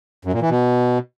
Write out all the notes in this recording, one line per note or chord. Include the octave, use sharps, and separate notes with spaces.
F#2
A#2
E3
B2